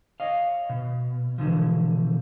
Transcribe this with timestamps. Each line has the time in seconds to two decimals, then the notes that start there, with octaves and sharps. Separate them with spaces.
0.20 C#5 D#5 F5
0.70 B2
1.38 B2 D3 E3 F3